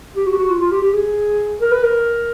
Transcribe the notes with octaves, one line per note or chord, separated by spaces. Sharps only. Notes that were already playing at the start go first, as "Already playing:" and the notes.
G4
F#4
G4
F#4
F4
F4
G4
G4
G#4
A#4
B4
A#4